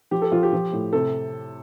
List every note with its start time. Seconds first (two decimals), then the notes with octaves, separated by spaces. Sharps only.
0.11 F3 G4
0.22 A4
0.32 F3 F4
0.43 G4
0.53 F3
0.73 A2
0.93 C3 A4